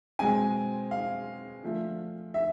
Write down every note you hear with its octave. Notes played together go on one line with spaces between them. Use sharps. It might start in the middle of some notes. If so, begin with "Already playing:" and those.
B2 G#3 C4 G#5
F5
D3 F3 A3
E5